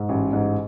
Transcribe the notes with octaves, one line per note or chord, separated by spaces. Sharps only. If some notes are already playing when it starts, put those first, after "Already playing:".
Already playing: G#2
A1
G#2